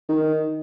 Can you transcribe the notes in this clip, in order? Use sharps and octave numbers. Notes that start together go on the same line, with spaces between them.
D#3